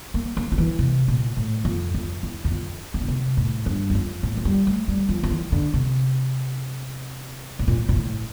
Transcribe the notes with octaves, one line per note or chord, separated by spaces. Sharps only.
A#3
A#3
F3
E3
C3
A#2
A2
F2
F2
E2
E2
F2
E3
D3
C3
A2
G2
E2
F2
A2
F3
G3
A3
G3
F3
F3
E3
D3
C3
A2
A#2
A#2
A2